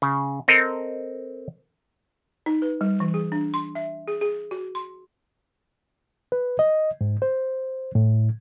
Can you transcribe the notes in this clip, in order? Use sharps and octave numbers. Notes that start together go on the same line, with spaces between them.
C#3
C4 A4 A#4 D#5
D#4
B4
G3
E3
G#4
D4
C6
E5
G#4
G#4
F#4
C6
B4
D#5
G#2
C5
A2